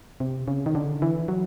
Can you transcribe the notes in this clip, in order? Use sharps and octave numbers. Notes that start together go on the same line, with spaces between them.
C3
C#3
D#3
D3
E3
F#3